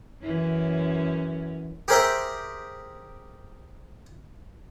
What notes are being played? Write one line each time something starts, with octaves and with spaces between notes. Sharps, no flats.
F#2 E3 C#4
G4 G#4 A#4 C5 E5 G5